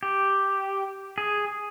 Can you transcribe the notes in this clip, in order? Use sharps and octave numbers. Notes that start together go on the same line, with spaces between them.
G4
G#4